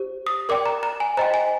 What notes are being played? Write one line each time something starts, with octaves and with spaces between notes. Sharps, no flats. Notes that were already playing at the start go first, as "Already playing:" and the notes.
Already playing: G4 C5
D#6
A#4 D5 G5 D6
A#5
A#5
G#5
C5 D#5 G5 A#5
G#5